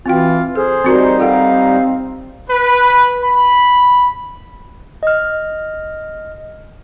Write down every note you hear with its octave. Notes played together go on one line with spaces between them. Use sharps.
E3 C4 F4 F#4 G5
G#4 A4 C5
G3 C4 D#4 F#4 A#4
C4 F4 A4 F5 F#5
B4
B5
D#5 F6